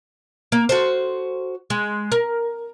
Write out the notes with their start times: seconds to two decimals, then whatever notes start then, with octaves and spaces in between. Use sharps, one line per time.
0.52 A#3
0.69 F#4 A4 C5
1.70 G#3
2.12 A#4